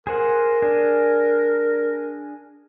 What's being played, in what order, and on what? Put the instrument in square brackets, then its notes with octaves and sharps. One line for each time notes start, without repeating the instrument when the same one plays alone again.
[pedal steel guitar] G#4 C5 F#5 [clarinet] A#4
[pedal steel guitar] D4 G#4